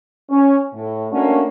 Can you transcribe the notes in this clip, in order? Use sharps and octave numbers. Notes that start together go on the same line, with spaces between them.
C#4
A2
A3 A#3 C#4 D4 F#4